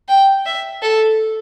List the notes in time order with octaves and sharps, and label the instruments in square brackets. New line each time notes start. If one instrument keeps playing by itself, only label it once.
[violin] G5
E5
A4